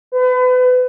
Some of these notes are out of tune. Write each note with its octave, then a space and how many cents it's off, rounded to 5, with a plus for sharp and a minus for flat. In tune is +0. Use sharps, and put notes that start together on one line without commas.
B4 +35